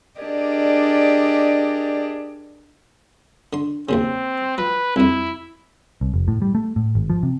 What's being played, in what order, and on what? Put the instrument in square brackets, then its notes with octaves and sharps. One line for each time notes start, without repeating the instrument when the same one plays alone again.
[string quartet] D4 G4 G#4 A#4 D5 D#5
[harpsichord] D3 C6
[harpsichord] D#2 A#2 C#3 [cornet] C4
[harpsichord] F3 [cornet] B4
[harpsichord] C2 F2 [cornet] E4
[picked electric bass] C2
F1
A2
G3
A3
A2
G#1
F3
C3